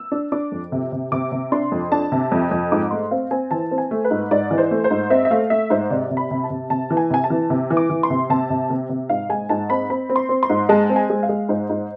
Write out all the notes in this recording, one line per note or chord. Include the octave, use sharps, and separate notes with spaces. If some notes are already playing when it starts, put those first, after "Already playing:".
Already playing: E6
D4
D4 D6
F2
C3
C3
C3 D6
C3
D4 C6
F2
D4 A5
C3
F2
F2
G#2 D6
A3 C6
C4 F5
C4 G#5
E3 A5
C4
G#5
A3
B4
G#2
G#2 D5
E3
C5
A3
C5
G#2
C4 E5
E5
A3 F5
A3 E5
G#2 C5
C3 D5
C3
B5
C3
A5
C3
C3 A5
E3
G#5
C3 G#5
A5
E3
C3
E3
D6
E3
C6
C3
C3 A5
C3
C3
C3
G#2 F5
G#3 G#5
G#2 A5
C4 B5
C4 B5
C4
C6
C4
C6
G#2
G#3 A5
C4
G#5
G#3
F5
G#3
G#2 C5
G#2